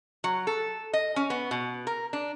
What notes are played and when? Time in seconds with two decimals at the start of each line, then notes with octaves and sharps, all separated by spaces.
0.24 F#3
0.47 A4
0.93 D#5
1.16 C#4
1.30 B3
1.51 B2
1.87 A#4
2.13 D4